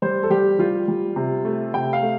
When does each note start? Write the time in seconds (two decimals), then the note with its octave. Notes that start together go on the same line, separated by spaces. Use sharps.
0.02 G3 C5
0.23 A4
0.30 G3 G4
0.59 G3 F4
0.88 G3
1.16 C3
1.45 A3
1.74 C3 G5
1.93 F5
2.03 A3